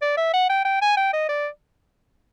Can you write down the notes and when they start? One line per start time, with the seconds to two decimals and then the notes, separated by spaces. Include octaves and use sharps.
0.02 D5
0.17 E5
0.34 F#5
0.49 G5
0.65 G5
0.82 G#5
0.97 G5
1.13 D#5
1.29 D5